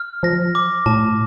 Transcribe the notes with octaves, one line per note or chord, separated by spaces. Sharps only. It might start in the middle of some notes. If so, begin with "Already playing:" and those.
Already playing: F6
F3 A#6
D6
A2 A5